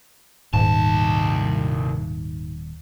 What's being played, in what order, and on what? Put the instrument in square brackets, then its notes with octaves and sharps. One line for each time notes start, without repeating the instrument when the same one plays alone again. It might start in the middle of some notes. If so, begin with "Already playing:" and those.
[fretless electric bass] D#1 [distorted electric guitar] C2 A5 [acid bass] G#2